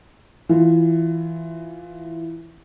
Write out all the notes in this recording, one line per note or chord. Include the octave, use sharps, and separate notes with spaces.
E3 F4